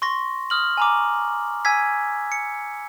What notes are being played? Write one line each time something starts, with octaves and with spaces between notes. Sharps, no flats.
C6 C#6 A#6
D#6 F6 F#7
G#5 A#5 D6
G#5 E6 G#6 B6
C#7